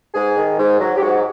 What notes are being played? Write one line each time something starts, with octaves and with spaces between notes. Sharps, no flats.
G#2 G#4
D#3
G#2
F#3
G4
G#2 F#4